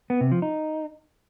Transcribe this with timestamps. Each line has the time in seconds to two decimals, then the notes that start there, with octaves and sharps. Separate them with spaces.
0.10 B3
0.21 C3
0.31 F3
0.42 D#4